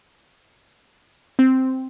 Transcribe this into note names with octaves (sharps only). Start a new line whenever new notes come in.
C4